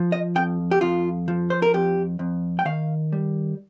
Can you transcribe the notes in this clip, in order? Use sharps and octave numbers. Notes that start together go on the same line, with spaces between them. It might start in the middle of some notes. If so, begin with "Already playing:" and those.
Already playing: F3
D#5
F2 G5
G4
F2 F4
F3
C5
A#4
F2 G4
F2
G5
D#3 F5
G3